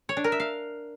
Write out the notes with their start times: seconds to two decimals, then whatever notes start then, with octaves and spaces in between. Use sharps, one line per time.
0.09 C#5
0.17 D4
0.24 A#4
0.32 E5
0.40 F5